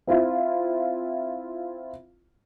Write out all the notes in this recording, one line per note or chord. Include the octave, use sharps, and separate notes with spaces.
C4 E4 F4